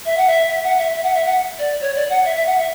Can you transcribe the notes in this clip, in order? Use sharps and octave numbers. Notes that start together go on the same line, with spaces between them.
E5
F#5
E5
E5
F#5
E5
E5
F#5
E5
F#5
D5
C#5
D5
F#5
E5
E5
F#5
E5